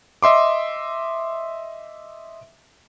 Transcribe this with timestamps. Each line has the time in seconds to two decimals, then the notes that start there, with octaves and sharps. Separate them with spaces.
0.23 D#5 E5 C6 D6